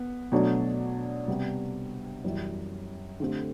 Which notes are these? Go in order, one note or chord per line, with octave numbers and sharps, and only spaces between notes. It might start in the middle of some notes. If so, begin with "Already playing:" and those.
Already playing: B3
B2 F#3 A3 D4
C3 G3 B3
F#2 E3 G3
D3 A3 C4 G4